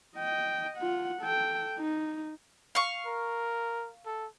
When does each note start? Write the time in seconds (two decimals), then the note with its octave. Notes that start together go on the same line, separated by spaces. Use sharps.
0.17 D#5 G5
0.78 F4 F#5
1.22 A4 G5
1.78 D#4
2.75 F5 C#6
3.06 A#4
4.06 A4